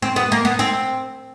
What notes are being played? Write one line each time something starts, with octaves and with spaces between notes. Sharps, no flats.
C4
B3
A#3
B3
C4